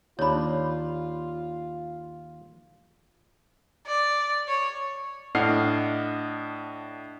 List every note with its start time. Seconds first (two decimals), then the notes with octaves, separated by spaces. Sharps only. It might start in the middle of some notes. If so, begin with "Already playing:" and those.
0.19 D#2 D4 F4 C#5 B5
3.86 D5
4.48 C#5
5.35 A2 D4 D#5 F#5 F6 C7